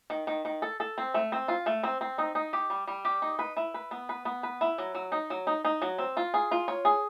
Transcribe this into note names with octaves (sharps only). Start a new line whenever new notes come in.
D#3
D#3
D#3
A4
A4
C4
A3
C4
F4
A3
C4
C4
D#4
D#4
G4
G3
G3
G4
D#4
B4
E4
B4
B3
B4
B3
B4
E4
F#3
F#3
D#4
F#3
D#4
D#4
F#3
C4
F4
G#4
F4
C#5
G#4